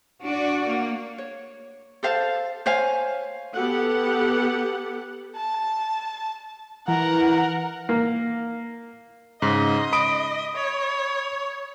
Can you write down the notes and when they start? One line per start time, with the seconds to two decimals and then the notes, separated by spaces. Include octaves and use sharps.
0.23 D4 F#4 D5
0.65 A#3
1.18 C#5
2.03 A4 C5 F5 A5
2.66 C5 C#5 F5 G#5
3.53 B3 G4 A4 F#5
5.36 A5
6.88 E3 A#4 F#5
7.89 A#3
9.42 G#2 C#3 D#5
9.93 B5 D#6 D7
10.55 C#5